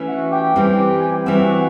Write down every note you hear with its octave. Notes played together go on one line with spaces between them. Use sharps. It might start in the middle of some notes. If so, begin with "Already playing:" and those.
Already playing: E3 A3 C#4
F#4 F#5
G4 G5
E3 G3 C4
G#5
G5
E3 G3 C4 F#4 F#5
F#4 F#5